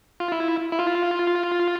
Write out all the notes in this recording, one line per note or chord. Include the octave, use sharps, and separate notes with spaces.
F4
E4
E4
F4